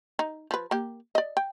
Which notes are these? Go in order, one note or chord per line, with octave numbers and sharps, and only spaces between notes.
D#4
F3 B4
A#3 G4
D5 D#5
G5